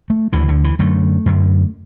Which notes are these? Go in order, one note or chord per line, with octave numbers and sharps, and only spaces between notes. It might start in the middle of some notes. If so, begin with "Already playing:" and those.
A3
D2 D3 E3
D3
E3
F#2 D3 A3
F#2 D3